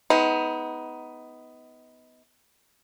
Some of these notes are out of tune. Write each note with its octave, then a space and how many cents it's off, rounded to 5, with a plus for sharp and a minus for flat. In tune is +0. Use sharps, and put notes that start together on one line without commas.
G#3 +40 B3 +15 D#4 +30